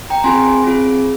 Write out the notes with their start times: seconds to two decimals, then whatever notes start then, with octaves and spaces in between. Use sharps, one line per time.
0.10 G5 A#5
0.24 C4 F4 G#4 G#5 C6
0.64 C4 F4 G#4